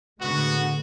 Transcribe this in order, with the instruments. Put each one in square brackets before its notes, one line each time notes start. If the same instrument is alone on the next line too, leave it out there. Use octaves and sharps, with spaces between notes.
[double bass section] A2 D3 G#3 [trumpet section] B3 F#4